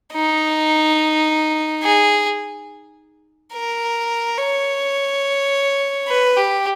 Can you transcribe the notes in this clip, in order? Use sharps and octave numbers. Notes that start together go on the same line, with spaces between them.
D#4
G#4
A#4
C#5
B4
G4